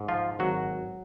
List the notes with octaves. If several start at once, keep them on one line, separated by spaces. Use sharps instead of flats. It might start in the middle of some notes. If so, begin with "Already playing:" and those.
Already playing: G#2
F3 F4
G#1 F#3 F#4